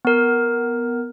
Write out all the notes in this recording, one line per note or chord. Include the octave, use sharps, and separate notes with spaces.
B3 A#4